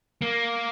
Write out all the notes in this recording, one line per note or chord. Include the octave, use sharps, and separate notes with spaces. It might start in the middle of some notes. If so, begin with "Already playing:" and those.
A#3